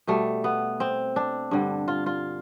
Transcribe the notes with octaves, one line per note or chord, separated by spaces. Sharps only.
B2 G3 A3
B3
C4
D4
G2 D3 G3
F4
F4